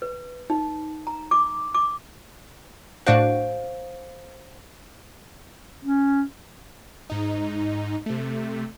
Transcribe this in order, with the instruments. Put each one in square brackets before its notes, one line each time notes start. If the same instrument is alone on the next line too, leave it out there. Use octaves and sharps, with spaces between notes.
[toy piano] B4
D#4
A#5
D6
D6
[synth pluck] A2 D4 F#4 [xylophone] C5 F5 D7
[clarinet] C#4
[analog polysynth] G#2 D#4
C3 A3